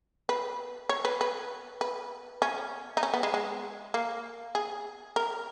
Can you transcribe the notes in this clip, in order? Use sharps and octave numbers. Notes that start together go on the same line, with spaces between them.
B4
C#5
B4
B4
B4
C#4
D#4
C#4
B3
G#3
G#3
A#3
G#4
A#4